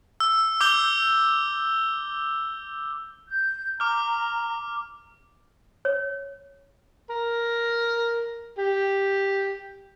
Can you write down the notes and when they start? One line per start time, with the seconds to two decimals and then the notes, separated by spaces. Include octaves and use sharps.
0.20 E6
0.61 D6 E6 G6 G7
3.29 G6
3.80 A#5 D6 F6
5.85 C#5
7.10 A#4
8.58 G4